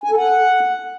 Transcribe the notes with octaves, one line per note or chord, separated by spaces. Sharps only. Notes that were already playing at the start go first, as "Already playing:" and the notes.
G#5
A4
F#5